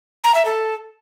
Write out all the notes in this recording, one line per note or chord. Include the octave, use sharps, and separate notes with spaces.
A#5
E5
A4